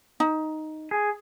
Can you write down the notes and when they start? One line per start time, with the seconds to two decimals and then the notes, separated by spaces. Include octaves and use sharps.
0.20 D#4
0.91 G#4